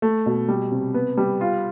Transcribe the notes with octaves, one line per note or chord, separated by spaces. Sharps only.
A3
B2
G3
C3
B3
G3
F4